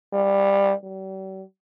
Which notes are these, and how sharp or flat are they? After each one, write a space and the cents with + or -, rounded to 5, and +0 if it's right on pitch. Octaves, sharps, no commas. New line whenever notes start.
G3 +15
G3 -45